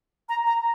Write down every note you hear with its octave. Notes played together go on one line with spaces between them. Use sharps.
A#5
A#5